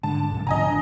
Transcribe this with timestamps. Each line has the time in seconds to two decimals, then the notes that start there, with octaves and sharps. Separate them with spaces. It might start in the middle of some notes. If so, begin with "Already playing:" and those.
0.03 G#2 D3 A5
0.30 F#1 B1 F#2
0.47 B2 D3 F3 D#5 G#5 A#5
0.67 G#1 D4